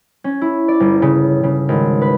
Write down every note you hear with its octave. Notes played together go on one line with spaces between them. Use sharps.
C#4
E4
D5
G1
C#3
C#3
G#1
B4